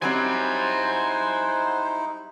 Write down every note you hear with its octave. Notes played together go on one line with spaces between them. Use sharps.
F#3 G3 C4 D#4 E4 C5 F#5 G#5